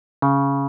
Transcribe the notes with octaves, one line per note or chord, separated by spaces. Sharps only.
C#3